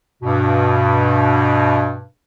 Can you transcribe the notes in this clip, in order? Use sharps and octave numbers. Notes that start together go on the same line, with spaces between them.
G2 B2